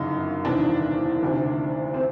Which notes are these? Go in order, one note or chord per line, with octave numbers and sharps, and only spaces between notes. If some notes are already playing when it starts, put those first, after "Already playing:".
Already playing: G1 F#2 C#3 E3 D#4
E1 E2 C3 D#3 D4
D2 C3 D#3
C4